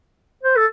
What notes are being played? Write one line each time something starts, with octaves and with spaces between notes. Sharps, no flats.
C5
A4